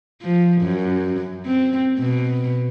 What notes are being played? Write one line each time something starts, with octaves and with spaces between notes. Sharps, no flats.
F3
F#2
C4
B2